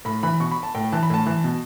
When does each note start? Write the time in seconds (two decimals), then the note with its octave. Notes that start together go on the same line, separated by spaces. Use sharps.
0.05 A2 B5
0.23 E3 B5
0.40 B2 C#6
0.51 B5
0.63 A5
0.75 A2 G5
0.92 E3 A5
1.03 B5
1.10 A2 A5
1.27 E3
1.44 B2